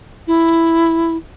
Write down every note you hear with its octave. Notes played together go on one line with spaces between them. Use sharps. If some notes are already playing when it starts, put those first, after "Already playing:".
E4